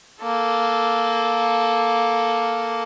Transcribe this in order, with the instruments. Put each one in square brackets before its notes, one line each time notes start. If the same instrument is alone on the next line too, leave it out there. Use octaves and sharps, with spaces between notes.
[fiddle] A#3 A4